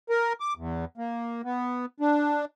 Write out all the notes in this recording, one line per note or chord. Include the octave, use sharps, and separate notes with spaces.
A#4
D6
E2
A#3
B3
D4